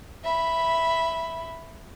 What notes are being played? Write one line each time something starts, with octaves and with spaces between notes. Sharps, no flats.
E5 B5